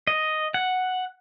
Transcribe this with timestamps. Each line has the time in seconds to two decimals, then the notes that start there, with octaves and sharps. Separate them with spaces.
0.07 D#5
0.54 F#5